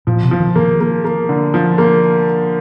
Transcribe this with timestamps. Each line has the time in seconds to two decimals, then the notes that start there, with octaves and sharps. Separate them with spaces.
0.07 A#2 F3
0.23 C3
0.31 F3
0.40 D#3
0.56 D#3 A#3
0.80 A#3
1.05 A#3
1.29 D3
1.54 F3
1.78 A#3